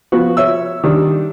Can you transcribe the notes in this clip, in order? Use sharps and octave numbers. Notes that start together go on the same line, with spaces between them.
F3 B3 F#4
C#5 E5 E6
D#3 G3 D4